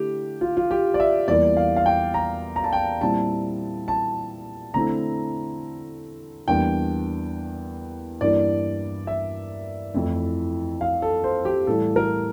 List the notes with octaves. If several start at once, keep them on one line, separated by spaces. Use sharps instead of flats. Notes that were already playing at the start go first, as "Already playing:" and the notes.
Already playing: D3 A3 E4 G4
F4
F4
G4
D5
E5
E2 E3 G3 A#3 D5
F5
F5
G5
A#5
A#5
A5
G5
A#2 G3 C4 E4 A5
A5
D3 A3 C4 E4 A#5
E2 E3 G3 A#3 D4 G5
G2 E3 A#3 E4 D5
E5
F2 E3 A3 E4
F5
A4
C5
G4
A2 E3 G3 A4
A#4